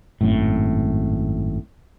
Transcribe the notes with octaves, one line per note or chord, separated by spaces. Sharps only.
G#1 F#2 A2